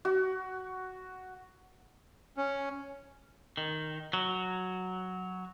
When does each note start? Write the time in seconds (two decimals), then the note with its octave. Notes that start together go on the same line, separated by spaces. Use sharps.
0.05 F#4
2.37 C#4
3.57 D#3
4.13 F#3